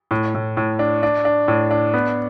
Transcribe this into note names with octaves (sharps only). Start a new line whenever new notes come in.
A2
A2
A2
D4
D4
D4
A2
D4
B3